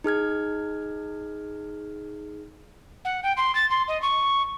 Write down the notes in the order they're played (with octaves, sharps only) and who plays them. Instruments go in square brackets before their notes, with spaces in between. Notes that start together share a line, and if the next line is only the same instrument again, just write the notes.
[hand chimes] D#4 G#4 F6 G#6
[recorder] F#5
G5
C6
A6
C6
D#5
C#6